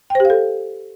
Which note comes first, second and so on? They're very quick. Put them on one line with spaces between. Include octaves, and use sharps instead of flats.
G5 C5 G4 F5 A4